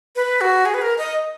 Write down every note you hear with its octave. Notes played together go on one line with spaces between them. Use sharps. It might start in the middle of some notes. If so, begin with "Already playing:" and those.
B4
F#4
G#4
B4
A#4
D#5